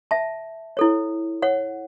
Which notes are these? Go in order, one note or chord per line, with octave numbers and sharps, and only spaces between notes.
E5 A5
E4 A4 C#5
C#5 F#5